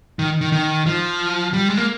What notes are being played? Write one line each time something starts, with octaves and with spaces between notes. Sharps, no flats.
D#3
D#3
D#3
F3
G3
G#3
A#3